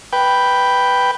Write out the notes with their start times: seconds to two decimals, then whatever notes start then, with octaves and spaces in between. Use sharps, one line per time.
0.13 B4 G5